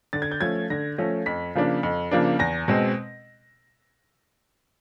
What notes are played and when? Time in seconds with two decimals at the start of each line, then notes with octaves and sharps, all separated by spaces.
0.13 D3 A6
0.22 G#6
0.31 G6
0.41 F3 A3 C#4 G#6
0.70 D3 A#6
0.98 F3 A3 C#4
1.26 F2 B6
1.55 C#3 F3 A#3 D4
1.83 F2
2.11 C#3 F3 A#3 D4
2.39 E2 A#6
2.68 B2 G#3 C4